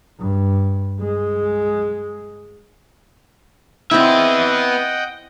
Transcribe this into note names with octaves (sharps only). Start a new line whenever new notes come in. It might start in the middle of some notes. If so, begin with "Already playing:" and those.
G2
G#3
B3 C4 E4 D#5 E5 F#5 G5